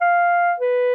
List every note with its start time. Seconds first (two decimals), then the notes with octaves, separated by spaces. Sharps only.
0.01 F5
0.60 B4